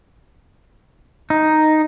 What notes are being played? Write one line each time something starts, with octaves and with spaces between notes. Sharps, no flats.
D#4